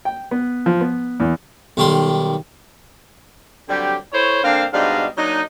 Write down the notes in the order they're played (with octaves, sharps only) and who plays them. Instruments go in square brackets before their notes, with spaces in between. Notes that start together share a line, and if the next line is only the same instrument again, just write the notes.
[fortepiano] G5
B3
F3
B3
E2
[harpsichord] B1 D#3 G3 C6
[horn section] D3 F#3 G3 C4 G4
E4 A4 C5 C#5
D3 A#3 C4 D4 F5
G#2 B2 G3 D4 D#5 F5
F#3 A#3 D4 D#4